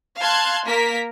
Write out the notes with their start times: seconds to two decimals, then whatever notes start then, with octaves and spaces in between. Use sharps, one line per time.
0.19 F5 A5 C6 F#6 G#6
0.67 A#3 A#4 B6